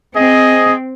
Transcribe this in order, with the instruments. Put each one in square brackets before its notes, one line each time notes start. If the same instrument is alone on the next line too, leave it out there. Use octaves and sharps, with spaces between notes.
[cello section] C4 [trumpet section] G#4 D#5